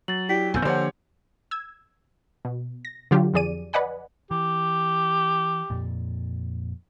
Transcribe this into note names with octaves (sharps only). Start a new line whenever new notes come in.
F#3 A6 F#7
E4 G4 D5 B6
B1 F#2 B3 G#5 E6 G6
D3 F3 A#3 G4 C5 C#5 F#5
E6 G#6
B2
A#6
D3 F#3 F4 G4
F2 F3 G#4 D5 D#7
B4 D5 D#5 F#5 G#5 B5
E3 G4
F2 A#2